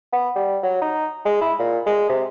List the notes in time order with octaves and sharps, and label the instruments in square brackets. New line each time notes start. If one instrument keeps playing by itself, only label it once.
[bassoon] B3
G3
F#3
D#4
G#3
E4
A#2
G#3
C3